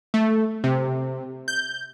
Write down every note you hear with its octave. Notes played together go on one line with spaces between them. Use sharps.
A3
C3
G6